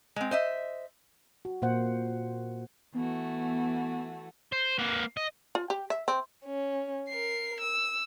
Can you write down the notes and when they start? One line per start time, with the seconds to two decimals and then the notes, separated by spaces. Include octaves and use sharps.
0.16 G#3 C4
0.31 C5 D#5 E5
1.45 F#4
1.62 A#2 A#3 C5 F#5
2.94 E3 A3 B3 F#4
4.52 C5
4.79 A#3 B4
5.17 D#5
5.55 F4
5.70 G4
5.90 E5
6.08 C4
6.45 C#4
7.09 A#4 C7
7.61 E6